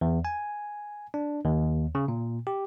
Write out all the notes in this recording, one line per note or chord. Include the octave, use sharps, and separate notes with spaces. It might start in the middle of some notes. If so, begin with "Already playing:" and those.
E2
G#5
D4
D#2
C#3
A#2
G4